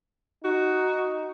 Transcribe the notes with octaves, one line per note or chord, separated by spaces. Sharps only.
D#4 F#4